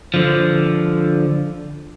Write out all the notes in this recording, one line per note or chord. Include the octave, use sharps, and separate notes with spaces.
D3 F3